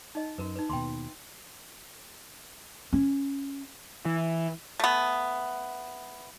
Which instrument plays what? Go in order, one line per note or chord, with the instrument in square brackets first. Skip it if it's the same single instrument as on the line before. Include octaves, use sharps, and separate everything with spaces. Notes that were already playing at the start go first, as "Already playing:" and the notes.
[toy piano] D#4 D#5
[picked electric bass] F#2 [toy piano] F#4 A#4 B4
[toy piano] D#4 B4
[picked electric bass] D#2 B2 [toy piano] G5 B5 C6
[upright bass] C#4
[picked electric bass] E3
[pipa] A3 B3